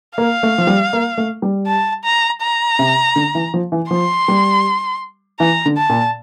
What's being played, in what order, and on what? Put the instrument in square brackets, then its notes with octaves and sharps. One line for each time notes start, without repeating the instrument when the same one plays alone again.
[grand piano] A#3 [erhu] F5
[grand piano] A3
F3
G3
A#3
A3
G3
[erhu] A5
A#5
A#5
[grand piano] C3
D3
E3
F3
E3
[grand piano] F3 [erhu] C6
[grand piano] G3
[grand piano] E3 [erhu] A#5
[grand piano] D3
[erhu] A5
[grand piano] A#2